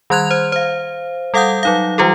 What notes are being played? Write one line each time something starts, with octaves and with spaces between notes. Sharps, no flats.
D#3 G3 C6 F#6 G#6 F7
C5
C5 F5
G3 A4 F5 F#5 D#6 G6
F#3 D#4 F5
E3 G3 F4 G4 A4